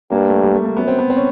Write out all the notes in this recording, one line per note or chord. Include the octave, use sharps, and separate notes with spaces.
G2 A#3
A3
G3
A3
A#3
F#2 B3
C4
B3
C4
C#4